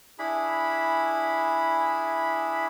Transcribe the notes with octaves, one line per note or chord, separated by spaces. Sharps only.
D4 E4 G#4 B5